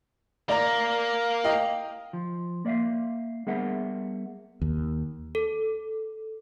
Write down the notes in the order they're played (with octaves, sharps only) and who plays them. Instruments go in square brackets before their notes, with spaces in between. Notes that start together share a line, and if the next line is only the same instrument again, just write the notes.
[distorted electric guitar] A#3 [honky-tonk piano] D5 A#5
[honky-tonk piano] D#5 F5 G5
[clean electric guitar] F3
A#3 D5 E5 F5
G3 B3 G#4 A#4 E5 F#5
[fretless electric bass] D#2
[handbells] A4